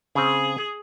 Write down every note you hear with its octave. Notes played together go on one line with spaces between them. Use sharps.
C#3 C4 G#4